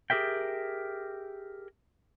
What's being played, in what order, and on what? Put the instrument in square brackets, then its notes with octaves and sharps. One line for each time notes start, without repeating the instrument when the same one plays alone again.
[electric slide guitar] G4 G#4 A#4 E5 G5